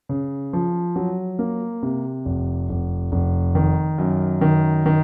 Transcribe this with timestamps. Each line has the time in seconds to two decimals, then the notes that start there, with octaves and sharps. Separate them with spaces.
0.09 C#3
0.53 F3
0.96 F#3
1.39 A#3
1.82 C3
2.25 F1
2.69 F1
3.12 F1
3.55 D#3
3.98 F#2
4.41 D#3
4.86 D#3